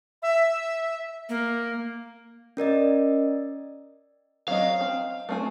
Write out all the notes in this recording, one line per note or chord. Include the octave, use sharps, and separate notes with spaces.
E5
A#3
C#4 A#4 D5 D#5
F#3 C4 D#5 F5
C4
A3 C4 G#5